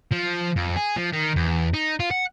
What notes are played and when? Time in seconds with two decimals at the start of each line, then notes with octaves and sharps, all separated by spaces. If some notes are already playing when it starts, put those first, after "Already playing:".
0.12 F3
0.57 F2
0.76 G#4
0.97 F3
1.13 D#3
1.36 E2
1.74 D#4
2.00 F4
2.11 F#5